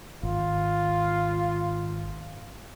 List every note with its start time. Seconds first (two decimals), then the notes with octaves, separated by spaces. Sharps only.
0.23 G#1 F4